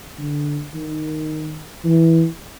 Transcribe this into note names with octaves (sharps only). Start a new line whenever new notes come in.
D3
D#3
E3